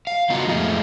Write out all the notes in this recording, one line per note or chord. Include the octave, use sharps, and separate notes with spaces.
F5
C#3 B3 D#4 F4 F#4
F2 A2 F3 G#3 A3